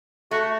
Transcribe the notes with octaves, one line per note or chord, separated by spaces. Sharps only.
A3 F#4